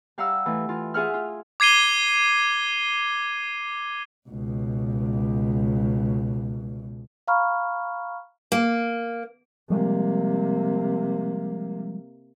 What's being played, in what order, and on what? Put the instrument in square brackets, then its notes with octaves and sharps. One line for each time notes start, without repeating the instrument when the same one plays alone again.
[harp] G3 F5 F#5 A#5 E6
E3 A3
E3 F4
F4 G#4 E5 F#5 F6
F4
[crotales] D6 G#6 C7 D#7 G7
[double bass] C#2 B2
[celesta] F5 A#5 B5 C#6 F6
[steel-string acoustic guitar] A#3
[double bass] C3 A#3 [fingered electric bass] F3 G3 G#3